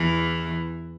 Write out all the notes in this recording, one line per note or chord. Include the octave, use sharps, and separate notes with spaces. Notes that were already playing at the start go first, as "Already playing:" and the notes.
Already playing: E2 E3